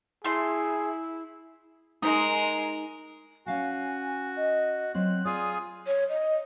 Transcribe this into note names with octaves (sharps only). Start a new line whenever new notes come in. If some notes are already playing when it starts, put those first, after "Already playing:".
A3 E4 G#4 C6
G#3 D#4 A#4
C#4 F#4 F5 F#5 G#5
D#5
F#3 C4 F4 F#6
F4 G#4 D5 D#6
C#5
D#5